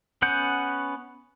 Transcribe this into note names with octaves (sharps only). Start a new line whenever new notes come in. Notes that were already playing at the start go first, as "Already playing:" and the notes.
B3 C#4 F#5 G6